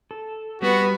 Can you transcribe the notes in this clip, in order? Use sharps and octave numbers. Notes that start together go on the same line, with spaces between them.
A4
G3 B3 F#4